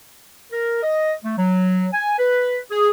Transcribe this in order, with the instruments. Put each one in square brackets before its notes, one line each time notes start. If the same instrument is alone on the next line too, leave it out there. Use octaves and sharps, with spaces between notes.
[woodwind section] A#4
D#5
A3
F#3
G#5
B4
G#4